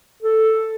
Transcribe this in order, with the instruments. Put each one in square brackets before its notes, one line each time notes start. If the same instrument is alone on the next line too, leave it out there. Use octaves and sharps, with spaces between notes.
[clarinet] A4